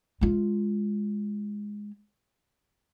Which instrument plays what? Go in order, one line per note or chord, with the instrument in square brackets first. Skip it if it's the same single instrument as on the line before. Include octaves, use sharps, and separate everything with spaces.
[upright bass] G#3 F4